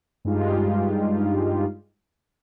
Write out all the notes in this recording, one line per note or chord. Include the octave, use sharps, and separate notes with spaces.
G2 G#3 D#4 F4 G4